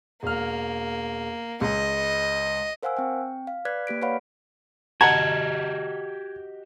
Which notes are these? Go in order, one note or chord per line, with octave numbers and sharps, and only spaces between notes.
E1 A#3 F6
C#2 D#5
A#4 C5 F5 F#5 G#5 E6
C4 G5
F5
B4 D5 F#6 G#6 B6
A#3 G4 B6 D7
B4 C#5 D5 F5 F#5 B5
F#4 G4 D#5 F#5 A5 A#5 G#6